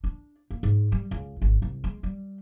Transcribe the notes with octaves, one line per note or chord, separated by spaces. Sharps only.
D4
A#3
G#2
G3
C#2
G#1
C2
G#3
G3